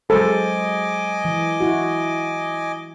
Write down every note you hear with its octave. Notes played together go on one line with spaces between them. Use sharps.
F#3 G#3 A4 C5 D#5 G#5 D6
E3
E4 F#4